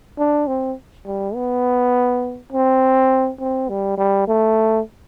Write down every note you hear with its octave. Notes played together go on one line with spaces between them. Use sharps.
D4
C4
G3
B3
C4
C4
G3
G3
A3